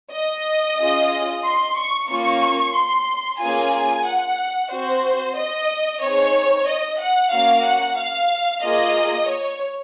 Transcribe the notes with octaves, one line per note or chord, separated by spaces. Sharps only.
D#5
C#4 F4 G#4
C6
C#6
A#3 C#4 F4 C#6
C6
A#3 C#4 F4 G#4 G#5
F#5
C4 F#4 C5
D#5
C4 D#4 G#4 C#5
D#5
F#5
A#3 C#4 F#4 F5
F#5
F5
A#3 F4 G#4 D#5
C#5